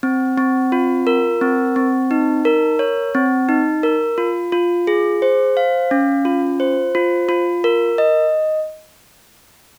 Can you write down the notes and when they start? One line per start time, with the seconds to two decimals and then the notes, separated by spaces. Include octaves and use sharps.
0.03 C4
0.38 C4
0.72 F4
1.07 A#4
1.41 C4
1.76 C4
2.11 D#4
2.45 A#4
2.79 C#5
3.15 C4
3.49 D#4
3.83 A#4
4.18 F4
4.52 F4
4.87 G#4
5.22 C5
5.57 F5
5.91 C#4
6.25 F4
6.60 C5
6.95 F4
7.29 F4
7.64 A#4
7.98 D#5